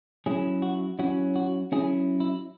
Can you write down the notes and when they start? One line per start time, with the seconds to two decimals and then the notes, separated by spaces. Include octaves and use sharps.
0.26 F#3 C#4 E4 G#4
0.62 F#4
0.99 F#3 C#4 E4 F#4
1.36 F#4
1.72 F#3 C#4 E4 G#4
2.20 E4